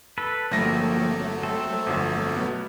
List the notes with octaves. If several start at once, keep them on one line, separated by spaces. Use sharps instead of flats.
A4 B4
G1 F3 F#3 A3 A#3 C4 A#6
C4 A4
G1 F2
B2 B3